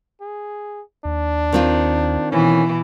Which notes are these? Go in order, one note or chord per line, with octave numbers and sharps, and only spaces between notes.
G#4
D#2 D4
D#3 C4 F4
B2 E3 C#4